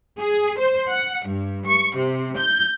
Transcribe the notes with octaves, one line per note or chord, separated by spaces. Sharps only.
G#4
C5
F#5
G2
C#6
C3
G6